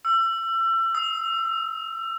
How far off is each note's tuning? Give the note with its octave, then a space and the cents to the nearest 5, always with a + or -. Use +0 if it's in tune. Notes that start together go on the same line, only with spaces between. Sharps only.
E6 +30
E6 -30